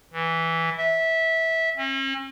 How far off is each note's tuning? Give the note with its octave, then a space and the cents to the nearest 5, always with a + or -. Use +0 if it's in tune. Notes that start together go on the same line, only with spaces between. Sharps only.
E3 -5
E5 -15
C#4 -45